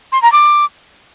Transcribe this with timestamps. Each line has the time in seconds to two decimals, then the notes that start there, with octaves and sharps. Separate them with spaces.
0.12 C6
0.22 A#5
0.32 D6